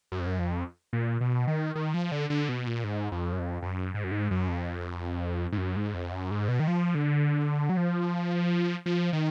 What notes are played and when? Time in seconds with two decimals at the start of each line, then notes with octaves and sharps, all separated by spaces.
0.12 F#2
0.20 F2
0.27 F#2
0.39 F2
0.93 A#2
1.21 B2
1.47 D#3
1.75 D#3
1.94 F3
2.12 D3
2.30 D3
2.49 B2
2.67 A#2
2.84 G#2
3.12 F2
3.32 F#2
3.39 F2
3.62 F2
3.66 F#2
3.94 G#2
4.04 F#2
4.12 G#2
4.31 F#2
4.49 F2
5.52 G#2
5.58 F#2
5.76 G#2
5.94 F2
6.12 F#2
6.31 G#2
6.48 B2
6.60 D#3
6.68 F3
6.95 D3
7.69 F#3
7.77 F3
8.86 F3
9.13 D#3